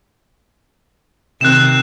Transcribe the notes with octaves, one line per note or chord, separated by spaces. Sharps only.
C3 D#3 C4 F#6 E7